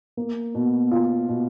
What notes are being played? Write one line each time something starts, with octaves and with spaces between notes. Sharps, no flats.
A#3
B2
F4
B2